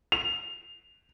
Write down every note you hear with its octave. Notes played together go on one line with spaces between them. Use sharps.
F7